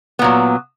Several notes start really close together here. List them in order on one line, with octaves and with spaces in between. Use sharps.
B3 A#2 F#3